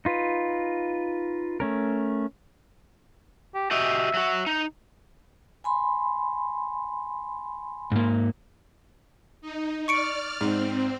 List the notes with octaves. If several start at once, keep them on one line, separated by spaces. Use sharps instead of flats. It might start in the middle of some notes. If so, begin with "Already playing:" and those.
D#4 F4 B4
A3 C#4 A#4
G4
F#4 G4 D#5 E5
F#3 F#4
D#4
G#5 B5 C6
G#2 A#3
D#4
D5 C#6 F6 C#7 D7
G#2 C4